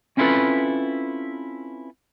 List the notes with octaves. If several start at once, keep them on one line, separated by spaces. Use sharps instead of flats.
C4 C#4 E4 F4 A4 B4